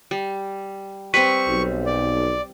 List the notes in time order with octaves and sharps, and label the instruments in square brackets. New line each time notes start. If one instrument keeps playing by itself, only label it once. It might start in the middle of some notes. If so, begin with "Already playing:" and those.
[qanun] G3
[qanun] G3 C4 [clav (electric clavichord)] B4 [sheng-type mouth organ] C#6
[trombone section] B1
[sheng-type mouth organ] D5